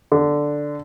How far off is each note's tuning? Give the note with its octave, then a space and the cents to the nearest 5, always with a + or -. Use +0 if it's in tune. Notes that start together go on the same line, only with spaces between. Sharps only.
D3 +0